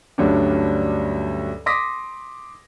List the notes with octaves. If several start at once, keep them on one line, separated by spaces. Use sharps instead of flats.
D2 G2 F#3 G3 C#4 D4
C6 D6 D#6 A#6 B6